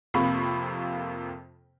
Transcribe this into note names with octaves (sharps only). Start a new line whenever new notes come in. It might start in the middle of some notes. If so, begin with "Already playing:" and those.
F2 C3 A#3 B5 C#6